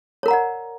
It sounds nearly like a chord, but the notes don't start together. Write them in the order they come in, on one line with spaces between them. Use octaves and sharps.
C#5 A#4 A#5 F#5 D5